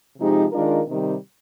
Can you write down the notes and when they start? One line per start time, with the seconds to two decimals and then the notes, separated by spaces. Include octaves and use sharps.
0.18 C3 F3 G#3 D#4 G4
0.52 D#3 G#3 D4 F4 A#4
0.87 C3 D#3 G3